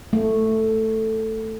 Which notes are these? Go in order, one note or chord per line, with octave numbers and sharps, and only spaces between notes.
A3